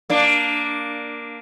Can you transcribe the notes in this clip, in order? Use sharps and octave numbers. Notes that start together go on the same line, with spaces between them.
A#3 D4